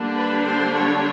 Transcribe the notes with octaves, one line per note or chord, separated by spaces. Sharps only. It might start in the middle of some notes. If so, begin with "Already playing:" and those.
Already playing: D3 G3 A#3 D4
B4
C5
C#5